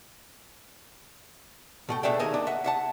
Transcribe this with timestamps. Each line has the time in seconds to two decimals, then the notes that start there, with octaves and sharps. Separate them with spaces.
1.89 B2 A3 G5
2.03 B2 A3 D4 G#4 E5 G5
2.19 D#2 G#4 A#4 D#5 E5
2.34 D4
2.47 E5 F#5
2.64 E5 F#5 A5